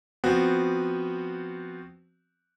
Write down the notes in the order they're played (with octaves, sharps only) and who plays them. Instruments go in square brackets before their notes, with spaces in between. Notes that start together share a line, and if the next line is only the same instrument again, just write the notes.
[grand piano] F3 B3 C4 F#4